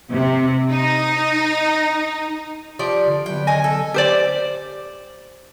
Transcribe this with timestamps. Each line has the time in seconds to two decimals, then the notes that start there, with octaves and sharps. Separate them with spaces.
0.12 C3
0.70 D#4
2.79 F3 G4 D5
3.07 D3
3.26 F#3 B3 G5
3.47 D#3 D#5 G#5
3.64 A4
3.94 G4 C5 D5